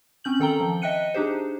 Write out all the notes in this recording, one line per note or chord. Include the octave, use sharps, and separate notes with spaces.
C4 C#4 G6 F#7
D#3 A4 G5 A#5 G7
F3
D#5 E5 G5 F#6 C#7 D#7
D4 D#4 G4 G#4 C5